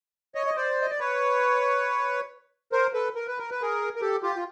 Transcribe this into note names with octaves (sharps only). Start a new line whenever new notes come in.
C#5 D#5
D#5
C5 D5
D#5
D5
B4 C#5
A#4 C5
A4 B4
A#4
B4
A#4
B4
G#4 A#4
A#4
G4 A4
F4 G4
F4